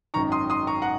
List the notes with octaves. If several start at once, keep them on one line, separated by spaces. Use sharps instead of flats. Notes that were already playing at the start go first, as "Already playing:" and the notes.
G#1 F#2 D#3 A#5 C#6
C6 D#6
C6 D#6
A#5 C#6
F#5 A#5